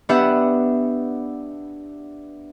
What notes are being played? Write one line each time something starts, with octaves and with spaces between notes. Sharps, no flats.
B3 D4 G4 E5 F#5